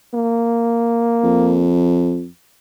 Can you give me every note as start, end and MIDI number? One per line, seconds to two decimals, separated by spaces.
0.14 1.75 58
1.24 2.28 41